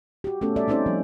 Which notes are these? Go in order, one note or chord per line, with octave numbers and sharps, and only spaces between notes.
F#4 G4
A3 B3 C#4 A4
G3 A4 D5 E5
C4 C#4 D#4 C5 D5
F3 G3